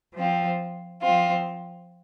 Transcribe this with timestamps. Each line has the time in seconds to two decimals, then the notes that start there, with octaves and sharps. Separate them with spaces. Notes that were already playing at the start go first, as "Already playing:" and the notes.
0.15 F3 C4 F4
1.01 F3 C4 F4